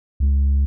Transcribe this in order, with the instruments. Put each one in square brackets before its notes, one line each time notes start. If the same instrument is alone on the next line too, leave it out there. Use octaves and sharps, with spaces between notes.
[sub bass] C#2